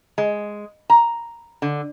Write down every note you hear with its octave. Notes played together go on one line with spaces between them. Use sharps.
G#3
A#5
D3